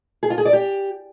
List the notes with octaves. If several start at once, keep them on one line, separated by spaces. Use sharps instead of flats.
G#4
F4
G#4
D5
G4